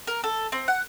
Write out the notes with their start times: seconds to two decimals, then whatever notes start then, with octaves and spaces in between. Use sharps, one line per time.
0.07 A#4
0.24 A4
0.52 C4
0.68 F#5